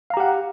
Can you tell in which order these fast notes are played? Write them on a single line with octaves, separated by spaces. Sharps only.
F5 A#5 G4 F#5